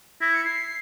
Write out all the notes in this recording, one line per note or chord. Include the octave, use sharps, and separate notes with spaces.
E4 A#6
C#7
C7